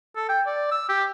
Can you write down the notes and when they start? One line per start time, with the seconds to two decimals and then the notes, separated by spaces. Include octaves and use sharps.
0.16 A4
0.29 G5
0.46 D5
0.72 E6
0.89 G4